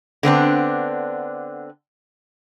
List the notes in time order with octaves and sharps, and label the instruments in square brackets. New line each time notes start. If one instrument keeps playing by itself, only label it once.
[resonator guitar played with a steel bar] D3 B3 C4 D4